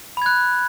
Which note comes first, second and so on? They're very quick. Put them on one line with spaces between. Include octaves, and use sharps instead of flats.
B5 G#6 F#6